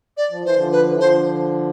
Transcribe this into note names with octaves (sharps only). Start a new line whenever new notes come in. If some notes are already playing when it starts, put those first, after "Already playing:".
D5
F3
E3 C5
D3 F3
B4
E3
D3 F3 C5